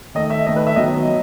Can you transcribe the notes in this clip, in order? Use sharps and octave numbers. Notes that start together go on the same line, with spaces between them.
D#3 A3 D#5
E5
D#3 A3 D#5
B4
E5
D#3 F#3 B3 D#5
F#3